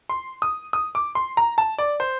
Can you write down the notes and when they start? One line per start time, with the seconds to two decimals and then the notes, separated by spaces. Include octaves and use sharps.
0.09 C6
0.42 D#6
0.73 D#6
0.95 D6
1.15 C6
1.37 A#5
1.58 A5
1.78 D5
2.00 C5